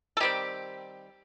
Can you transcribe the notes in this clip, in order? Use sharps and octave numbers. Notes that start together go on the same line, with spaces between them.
A4
D#3 G3 C4 G4